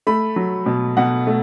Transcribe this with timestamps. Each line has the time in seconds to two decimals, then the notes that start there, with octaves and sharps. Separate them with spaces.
0.07 A3 B5
0.36 F#3
0.66 B2
0.97 B2 F#5
1.27 A3